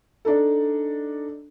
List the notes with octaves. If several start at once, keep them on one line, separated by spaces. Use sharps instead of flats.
D4 D#4 A4